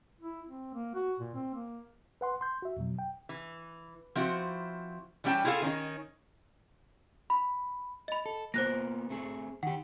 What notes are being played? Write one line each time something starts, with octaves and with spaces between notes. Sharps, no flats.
E4
C4
A#3
F#4
A#2
C4
A#3
B4 F#5 C6
C6 G6
F#4 E5
F2 B2 F#3
G5
E3
F3 C4 E4 F#4
E3 G3 C#4 E4 G5 A5
E4 F4 G#4 A4 F5
D#3 C#4 D#4
B5
D#5 B5
A4
A#3 B3 F4 C5 F#6 A#6
A3 C4 G#4
D#3 G4 F#5